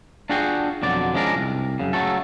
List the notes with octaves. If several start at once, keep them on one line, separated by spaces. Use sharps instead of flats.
D4 F4 F#4 G#4 G5
F2 B2 D3 F#3 D5
F3 G#3 C#4 D4 A#4
C2
F#2 C#3
C#3 F#3 A3 A4